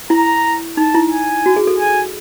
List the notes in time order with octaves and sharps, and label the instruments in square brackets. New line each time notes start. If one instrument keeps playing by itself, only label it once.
[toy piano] E4 [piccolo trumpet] A#5
[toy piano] D#4 [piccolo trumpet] A5
[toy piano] E4
[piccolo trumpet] G#5
[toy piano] F#4
G#4
A4
[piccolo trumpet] G#5